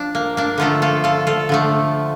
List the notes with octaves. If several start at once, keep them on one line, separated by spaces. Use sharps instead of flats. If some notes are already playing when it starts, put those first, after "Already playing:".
Already playing: F3 D4
A#3
A#3 D4
D3 F3 A3 F4 A4
F4 A4
F4 A4
F4 A4
D3 F3 A3